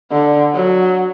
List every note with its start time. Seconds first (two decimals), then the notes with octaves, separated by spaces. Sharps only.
0.11 D3
0.55 F#3